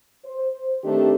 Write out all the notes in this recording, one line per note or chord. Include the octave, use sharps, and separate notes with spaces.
C5
D#3 A3 C4 D4 G4